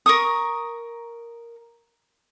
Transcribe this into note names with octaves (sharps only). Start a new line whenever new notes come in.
A#4 C#6 D#6